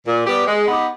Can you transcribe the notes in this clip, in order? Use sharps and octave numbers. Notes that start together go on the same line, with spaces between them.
A#2
G3 B3 G4
G#3
B3 D#4 G4